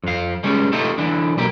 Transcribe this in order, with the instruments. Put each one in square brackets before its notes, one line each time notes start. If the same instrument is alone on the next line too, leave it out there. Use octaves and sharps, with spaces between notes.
[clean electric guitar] F2 F5
G3 G#3 C#4
A3 D#4 F4 G4 A4
D3 E3 D4
B1 A#3 G4